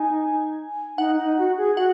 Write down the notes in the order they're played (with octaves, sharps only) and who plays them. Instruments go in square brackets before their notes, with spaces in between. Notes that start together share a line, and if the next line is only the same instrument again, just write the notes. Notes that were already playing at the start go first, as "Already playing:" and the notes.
Already playing: [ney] D#4 [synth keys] G#5
[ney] D#4 [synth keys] F#5
[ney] D#4
F#4
G#4
[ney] F#4 [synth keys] F#5